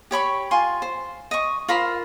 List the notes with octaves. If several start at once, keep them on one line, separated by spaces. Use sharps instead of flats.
G4 C#5 B5 C#6
F4 G#5 C6
C5
D#5 C#6
F4 A#4 C5 B5